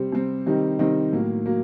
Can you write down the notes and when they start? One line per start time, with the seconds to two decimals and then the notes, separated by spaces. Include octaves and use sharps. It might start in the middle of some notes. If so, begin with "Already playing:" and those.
Already playing: C3 G3 C4
0.12 C3 G3 C4
0.46 C3 D#3 G3 C4 D#4
0.79 C3 D#3 G3 C4 D#4
1.13 A2 F#3 A#3
1.46 F#3 A#3